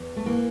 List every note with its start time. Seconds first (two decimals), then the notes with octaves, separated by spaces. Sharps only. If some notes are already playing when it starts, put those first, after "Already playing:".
Already playing: E2
0.16 A3
0.26 E3 A#3